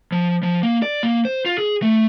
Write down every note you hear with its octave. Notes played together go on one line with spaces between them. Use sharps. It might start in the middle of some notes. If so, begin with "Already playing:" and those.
F3
F3
A#3
D5
A#3
C5
F4
G#4
A3